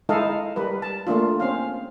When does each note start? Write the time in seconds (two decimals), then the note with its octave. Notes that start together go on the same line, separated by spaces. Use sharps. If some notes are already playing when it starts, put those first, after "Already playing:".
0.09 G#3 D#4 E4 A4 D#5 F5
0.56 G3 A#4 B4
0.82 A5
1.07 A3 A#3 D4 F4
1.40 C4 C#4 F5